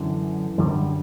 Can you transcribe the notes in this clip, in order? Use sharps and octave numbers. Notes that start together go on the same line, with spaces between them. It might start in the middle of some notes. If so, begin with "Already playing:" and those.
Already playing: F#2 D3 E3
F#2 D3 G3